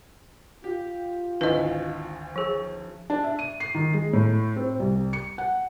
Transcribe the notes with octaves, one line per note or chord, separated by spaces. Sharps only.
F4 G4
G#1 D2 E3 B4 D#5
F3 G#4
D4
E5
D#7
C7
D#3
G#3
A2
C4
C2
C#7
F#5